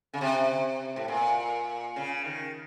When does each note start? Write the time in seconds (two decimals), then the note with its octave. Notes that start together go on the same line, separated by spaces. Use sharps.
0.14 C#3
0.21 C3
0.96 A2
1.08 A#2
1.96 C#3
2.24 D#3